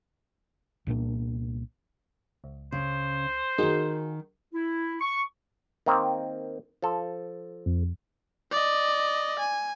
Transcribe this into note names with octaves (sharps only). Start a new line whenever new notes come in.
C2 A#2 A#3 D4
C#2
C#3 C5
D#3 D#4 F#4 G#4 A#4
E4
C#6
D#3 A#3 C4
F3 A4
F2
D5 D#5
G#5